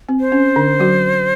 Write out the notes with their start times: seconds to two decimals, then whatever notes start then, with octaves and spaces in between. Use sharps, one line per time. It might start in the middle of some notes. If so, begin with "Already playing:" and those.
0.09 C4
0.20 C5
0.32 C#4
0.56 D3 D4
0.79 F#3 F#4